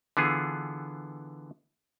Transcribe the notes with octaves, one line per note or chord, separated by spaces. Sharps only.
D3 E3 B3 F4 G#4